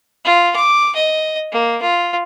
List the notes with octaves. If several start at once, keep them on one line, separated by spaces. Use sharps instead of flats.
F4
D6
D#5
A#3
F4